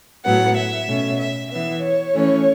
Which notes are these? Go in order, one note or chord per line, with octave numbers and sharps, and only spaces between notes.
A2 F#3 B3 F#5
E5
B2 A3 C#4
E5
E3 B3 E5
C#5
E3 A3 C#4